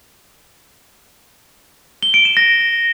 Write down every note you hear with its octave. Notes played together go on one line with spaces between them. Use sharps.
G7
D7
E7
A#6